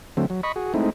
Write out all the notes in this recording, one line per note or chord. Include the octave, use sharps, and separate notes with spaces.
D3 F#3 A3 C4
F#3
D#5 B5 C#6
F#4 G#4
G#3 A3 C4 D#4 E4